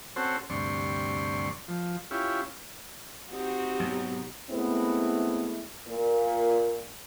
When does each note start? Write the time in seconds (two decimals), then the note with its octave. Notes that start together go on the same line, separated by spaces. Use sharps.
0.16 C4 C#4 F#4 A4 C5
0.50 D2 G2 C3 D5 C6 C#6
1.68 F3
2.11 C#4 E4 F4 G4
3.30 C4 D#4 F#4 G4
3.80 B1 G#2
4.50 G#3 A3 B3 C4 E4
5.88 A#2